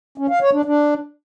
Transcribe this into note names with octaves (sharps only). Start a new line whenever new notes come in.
C#4
F5
C#5
D4
D4